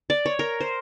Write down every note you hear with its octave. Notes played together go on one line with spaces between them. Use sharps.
D5
C#5
A#4
C5